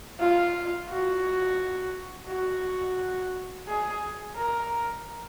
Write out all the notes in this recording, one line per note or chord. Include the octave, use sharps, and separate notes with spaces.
F4
F#4
F#4
G#4
A#4